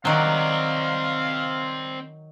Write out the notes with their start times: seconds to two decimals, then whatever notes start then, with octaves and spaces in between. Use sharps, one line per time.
0.05 D#3 F#3 C4 D5 F5